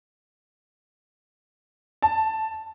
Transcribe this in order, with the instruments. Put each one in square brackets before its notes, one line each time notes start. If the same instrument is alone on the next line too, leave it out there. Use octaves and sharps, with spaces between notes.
[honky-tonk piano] A5